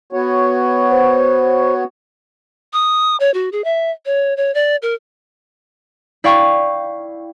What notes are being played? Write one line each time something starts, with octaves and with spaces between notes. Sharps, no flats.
B3 F#4 C#5
C5
D#6
C#5
F#4
G#4
E5
C#5
C#5
D5
A#4
E4 D5 F5 G5 C#6